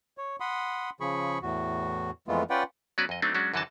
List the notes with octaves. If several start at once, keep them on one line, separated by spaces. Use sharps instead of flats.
C#5
F#5 B5 C6 D#6
C#3 F3 G#4 B5 C#6
E2 A2 F#4
F2 E3 G#3 A3 B3 F4
C#4 F4 B4 D5 F#5 G5
F#3 B3 C#4 F#4 B4 D5
F2 D#5
F#3 A3 C4 D4 D#4
F#3 G#3 C#4 D4 F#4
F#2 D3 E3 F#4 D#5 A5